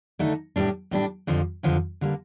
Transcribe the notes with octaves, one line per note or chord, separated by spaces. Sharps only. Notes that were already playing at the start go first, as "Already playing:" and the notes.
D3 A3 D#4
A2 G3 D4
A2 G3 D4
F2 D3 F3
F2 D3 F3
D3 G3 A#3